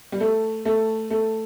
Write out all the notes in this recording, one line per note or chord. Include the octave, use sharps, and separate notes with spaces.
G3
A3
A3
A3